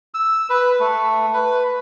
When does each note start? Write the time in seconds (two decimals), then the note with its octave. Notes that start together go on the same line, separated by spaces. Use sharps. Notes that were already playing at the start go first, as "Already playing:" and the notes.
0.14 E6
0.50 B4
0.80 A3
1.34 B4